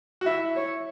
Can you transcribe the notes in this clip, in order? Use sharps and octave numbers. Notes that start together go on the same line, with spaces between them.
F#4
E4 E5
C#5